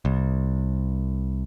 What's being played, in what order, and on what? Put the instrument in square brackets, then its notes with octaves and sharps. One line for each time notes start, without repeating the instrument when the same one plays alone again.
[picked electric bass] C2